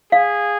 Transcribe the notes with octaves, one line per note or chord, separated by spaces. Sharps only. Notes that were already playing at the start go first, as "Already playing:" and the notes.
G#4 F5